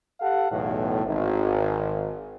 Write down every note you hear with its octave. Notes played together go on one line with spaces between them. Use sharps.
G4 A4 F5 F#5
B1 E2 A2
G#1